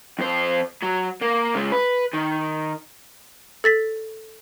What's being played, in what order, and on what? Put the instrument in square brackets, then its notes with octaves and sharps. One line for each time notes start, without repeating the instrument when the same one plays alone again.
[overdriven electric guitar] F2 C5
F#3
A#3
C#3 G#3
B4
D#3
[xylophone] A4 A6 B6